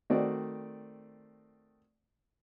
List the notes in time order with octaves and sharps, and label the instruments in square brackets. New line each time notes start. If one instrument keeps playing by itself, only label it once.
[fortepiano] D#3 A3 C4 F#4 D5